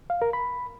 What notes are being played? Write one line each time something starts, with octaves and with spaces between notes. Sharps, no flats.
F5
A#4
B5